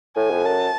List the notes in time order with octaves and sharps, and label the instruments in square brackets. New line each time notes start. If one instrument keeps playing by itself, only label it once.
[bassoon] A2 [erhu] G#5
[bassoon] F2
[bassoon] F#2 [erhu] A5